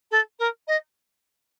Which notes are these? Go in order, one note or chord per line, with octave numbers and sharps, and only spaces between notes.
A4
A#4
D#5